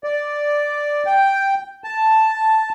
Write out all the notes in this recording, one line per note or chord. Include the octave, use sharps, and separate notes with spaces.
D5
G5
A5